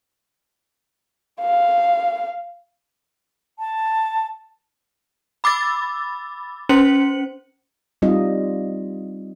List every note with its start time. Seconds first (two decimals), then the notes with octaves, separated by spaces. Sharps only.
1.41 F5
3.59 A5
5.44 B5 D6 E6 A6
6.69 C#4 C5 C#7 F#7
8.02 G3 C4 D#4 F4 D#5